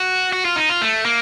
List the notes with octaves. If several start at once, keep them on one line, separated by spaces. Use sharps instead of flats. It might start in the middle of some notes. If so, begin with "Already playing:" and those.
Already playing: F#4
F#4
F4
D#4
F4
A3
A#3